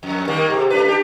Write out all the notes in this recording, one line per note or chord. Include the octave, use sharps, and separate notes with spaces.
F2
D#3 G3 A#3
G#2 C3
A3 D4 B4
D4 G4